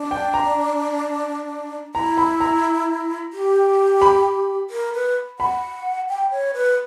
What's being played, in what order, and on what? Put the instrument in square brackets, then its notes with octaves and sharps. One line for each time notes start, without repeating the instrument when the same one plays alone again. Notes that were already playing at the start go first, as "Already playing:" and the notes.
Already playing: [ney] D4
[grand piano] G5
A#5
[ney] E4 [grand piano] A#5
[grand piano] B5
A#5
[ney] G4
[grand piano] B5
[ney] A#4
B4
[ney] F#5 [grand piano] B5
[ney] G5
C#5
B4